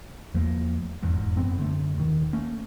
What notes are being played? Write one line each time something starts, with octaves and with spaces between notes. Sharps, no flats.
E2 F3 A3 A#3
F1 E2 G#2
F#2 B3 C4
F#2 D3 A3
D#1 D#3
A3 A#3 C#4